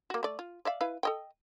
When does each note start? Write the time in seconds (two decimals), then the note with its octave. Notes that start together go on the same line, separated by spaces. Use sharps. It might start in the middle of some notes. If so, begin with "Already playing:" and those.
0.10 A#3 F#4
0.23 A3 D5
0.39 F4
0.65 D5 E5 F5
0.81 E4 B4 F5
1.03 A4 D#5 G5